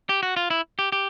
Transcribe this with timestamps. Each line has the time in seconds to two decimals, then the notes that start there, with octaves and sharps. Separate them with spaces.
0.09 G4
0.23 F#4
0.37 F4
0.50 E4
0.79 G4
0.92 G4